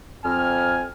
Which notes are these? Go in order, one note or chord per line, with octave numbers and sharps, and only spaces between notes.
F2 C4 G#5 F6